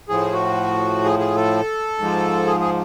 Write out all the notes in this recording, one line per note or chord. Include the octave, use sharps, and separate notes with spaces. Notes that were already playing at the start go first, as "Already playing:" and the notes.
A2 F3 G#4
F#4
G#4
G#4
A4
G#2 F3
G#4
G#4